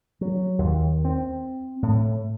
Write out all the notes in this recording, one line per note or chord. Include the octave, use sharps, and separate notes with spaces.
F#3
D#2
C4
A2